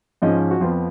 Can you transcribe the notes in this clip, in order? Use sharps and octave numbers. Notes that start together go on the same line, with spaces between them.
G#2 F3 G#3 C#4 D#5
F#4
F2 F3 B3 F4